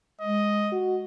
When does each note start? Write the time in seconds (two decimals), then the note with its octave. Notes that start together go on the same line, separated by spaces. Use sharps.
0.21 G#3 D#5
0.72 F#4